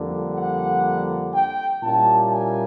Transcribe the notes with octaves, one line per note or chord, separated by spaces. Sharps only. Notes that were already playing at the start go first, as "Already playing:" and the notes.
Already playing: F2 D3 G3 A#3
F#5
G5
A#2 G3 A#3 C#4 E4 A5
G#5